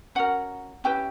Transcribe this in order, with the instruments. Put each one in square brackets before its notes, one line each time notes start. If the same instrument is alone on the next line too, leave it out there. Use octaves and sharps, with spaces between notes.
[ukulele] C#4 F#4 A#4 F#5
C#4 E4 G4 B4 G5